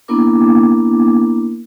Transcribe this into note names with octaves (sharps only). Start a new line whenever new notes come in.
A#3 B3 D4 E4 A#4 D6